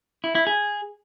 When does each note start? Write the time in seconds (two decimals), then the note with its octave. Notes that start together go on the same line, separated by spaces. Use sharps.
0.24 E4
0.35 E4
0.47 G#4